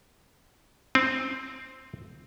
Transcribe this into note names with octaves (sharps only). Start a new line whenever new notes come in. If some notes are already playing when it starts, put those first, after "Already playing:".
C4